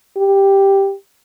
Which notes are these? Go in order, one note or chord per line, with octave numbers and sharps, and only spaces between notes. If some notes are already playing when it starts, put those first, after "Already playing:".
G4